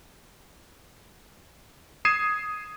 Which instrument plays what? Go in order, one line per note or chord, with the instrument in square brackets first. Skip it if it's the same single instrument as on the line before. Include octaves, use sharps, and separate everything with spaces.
[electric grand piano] D#6 G#6 C7 D#7 E7